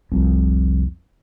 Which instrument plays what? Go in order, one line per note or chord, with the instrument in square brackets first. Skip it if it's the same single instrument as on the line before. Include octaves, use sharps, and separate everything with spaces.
[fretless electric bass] F1 C2